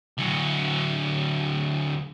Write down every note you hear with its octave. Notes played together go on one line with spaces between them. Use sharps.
D2 F#3